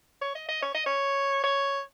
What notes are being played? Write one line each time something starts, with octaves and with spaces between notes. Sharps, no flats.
C#5
D#5
D#5
C#5
D#5
C#5
C#5